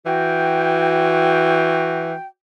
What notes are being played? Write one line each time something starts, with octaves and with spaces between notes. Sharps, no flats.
E3 F#4 G5